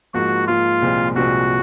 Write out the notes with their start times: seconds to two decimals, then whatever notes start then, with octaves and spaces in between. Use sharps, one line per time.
0.14 G#2 F3 A#3 F#4
0.47 G#2 F3 A#3 F4
0.82 C2 A#2 F3 G#3 C4
1.16 C2 A#2 F3 G#3 C4 F#4